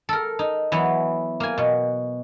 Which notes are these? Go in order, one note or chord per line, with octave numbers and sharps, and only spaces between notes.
A4 A#4
D#4
E3 F#3 B3
A#3 G#5
B2